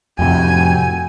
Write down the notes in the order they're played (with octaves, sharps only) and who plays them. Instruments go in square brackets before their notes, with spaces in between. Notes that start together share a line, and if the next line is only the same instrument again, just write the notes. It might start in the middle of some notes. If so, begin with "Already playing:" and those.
[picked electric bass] F2 A2 C3 [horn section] F#4 G5 [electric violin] G#5